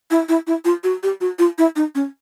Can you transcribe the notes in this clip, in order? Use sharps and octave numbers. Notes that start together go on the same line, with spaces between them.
E4
E4
E4
F4
F#4
G4
F#4
F4
E4
D#4
C#4